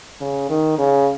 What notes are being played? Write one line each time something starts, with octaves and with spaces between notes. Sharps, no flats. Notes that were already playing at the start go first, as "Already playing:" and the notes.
C#3
D#3
C#3